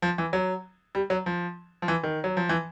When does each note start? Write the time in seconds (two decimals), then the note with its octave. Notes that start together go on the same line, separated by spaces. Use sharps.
0.02 F3
0.18 E3
0.33 F#3
0.95 G3
1.10 F#3
1.26 F3
1.82 F3
1.88 E3
2.03 D#3
2.24 F#3
2.37 F3
2.49 E3